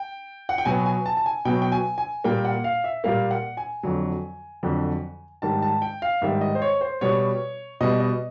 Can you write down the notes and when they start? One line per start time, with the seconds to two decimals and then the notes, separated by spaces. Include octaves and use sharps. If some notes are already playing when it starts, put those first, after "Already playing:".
Already playing: G5
0.49 F#5
0.58 G5
0.65 B2 F#3 B3 G#5
0.86 G#5
1.06 A5
1.17 A5
1.26 G#5
1.45 B2 F#3 B3 G5
1.62 G5
1.72 G#5
1.98 G#5
2.24 A#2 G3 A#3 G5
2.45 F#5
2.64 F5
2.84 E5
3.04 A#2 G3 A#3 F5
3.31 F#5
3.57 G#5
3.83 F2 D3 F#3
4.63 F2 D3 F#3
5.42 G#2 D#3 G3 A5
5.62 A5
5.82 G5
6.02 F5
6.22 G#2 D#3 G3 E5
6.41 D#5
6.55 C5
6.62 C#5
6.81 C5
7.01 B2 G3 B3 C#5
7.81 B2 G3 B3 D#5
8.00 D#5